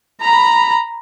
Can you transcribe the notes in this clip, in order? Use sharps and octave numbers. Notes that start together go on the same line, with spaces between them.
A#5 B5